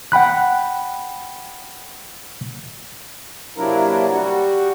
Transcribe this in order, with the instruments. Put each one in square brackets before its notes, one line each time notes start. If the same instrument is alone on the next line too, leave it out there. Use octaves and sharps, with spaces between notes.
[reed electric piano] F#5 G5 B5 F#6
[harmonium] C3 F#3 A#3 D4 E4 A#4
G3 F#4